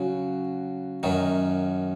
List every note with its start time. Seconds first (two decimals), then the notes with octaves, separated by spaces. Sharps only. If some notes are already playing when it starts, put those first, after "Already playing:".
Already playing: C#3 F#3 F#4
1.03 F#2 D#3 F#3